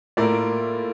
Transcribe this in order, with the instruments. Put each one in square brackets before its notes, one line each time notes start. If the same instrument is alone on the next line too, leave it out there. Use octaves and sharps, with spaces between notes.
[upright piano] A2 A3 [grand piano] A#3 F4 A#4 D5